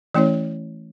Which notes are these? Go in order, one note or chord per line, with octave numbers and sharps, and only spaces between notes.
E3 A3 C#4 E4 C#5